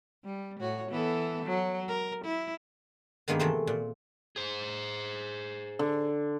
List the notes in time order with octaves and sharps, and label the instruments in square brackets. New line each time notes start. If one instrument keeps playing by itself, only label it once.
[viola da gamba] G3
A2 F#4 C#5
E3 B3 A4
F#3
A#4
E4
[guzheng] G2 D#3 G#3 A#3 B3
C3 E3 A3 C4 C5
A#2
[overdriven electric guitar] G#4 C5
[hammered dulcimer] D3